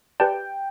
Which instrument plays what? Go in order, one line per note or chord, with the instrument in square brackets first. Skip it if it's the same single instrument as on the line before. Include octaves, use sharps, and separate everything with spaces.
[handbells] G4 B4 D5 A5 [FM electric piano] G5